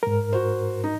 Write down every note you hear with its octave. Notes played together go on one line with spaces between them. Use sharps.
G#2 A#4
F#4 C5
D#4